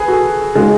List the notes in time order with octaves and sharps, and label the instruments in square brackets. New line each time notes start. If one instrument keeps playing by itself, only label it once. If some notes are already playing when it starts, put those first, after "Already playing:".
Already playing: [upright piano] G#4 B4
F#4 A4
[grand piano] C#3 G#3 [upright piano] D#4 F#4